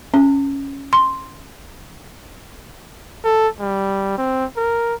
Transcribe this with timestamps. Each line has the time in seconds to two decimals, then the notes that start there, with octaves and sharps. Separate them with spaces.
0.14 C#4
0.93 C6
3.24 A4
3.60 G3
4.18 C4
4.57 A#4